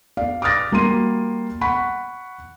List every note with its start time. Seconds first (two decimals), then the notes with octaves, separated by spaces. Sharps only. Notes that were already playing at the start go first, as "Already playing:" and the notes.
0.17 D5 F5
0.42 D6 D#6 F6 A6 A#6
0.72 G3 A#3 F#4 C6 D#7
1.61 F#5 B5 C#6